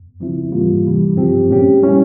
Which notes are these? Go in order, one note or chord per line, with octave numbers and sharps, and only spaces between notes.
C#3 F3 C4 E4
G#2 E3 G3 A#3 F4
C3 E3 G3
G2 F3 C4 G4
A#2 G#3 C#4 G4
G3 C#4 E4